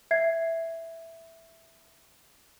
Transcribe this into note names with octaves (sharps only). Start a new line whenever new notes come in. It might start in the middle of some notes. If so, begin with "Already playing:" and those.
E5 G#6 C7